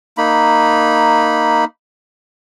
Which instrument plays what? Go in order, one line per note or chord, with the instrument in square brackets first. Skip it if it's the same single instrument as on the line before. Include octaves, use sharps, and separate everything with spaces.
[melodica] A#3 D#4 B5